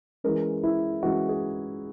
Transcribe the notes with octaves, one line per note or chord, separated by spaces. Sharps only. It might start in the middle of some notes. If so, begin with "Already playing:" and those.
E3 G#3 C#4 A#4
E4
E3 G#3 C#4 F#4
G#4